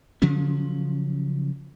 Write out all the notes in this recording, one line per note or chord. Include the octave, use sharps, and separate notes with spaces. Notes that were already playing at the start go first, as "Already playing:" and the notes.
C#3 F3 F#3 C#4